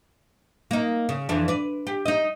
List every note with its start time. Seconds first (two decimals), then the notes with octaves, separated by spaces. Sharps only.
0.71 A#3 D#4
1.09 C#3
1.29 F2 E3 D4
1.48 B4 D5
1.87 G4
2.06 D#4 D#5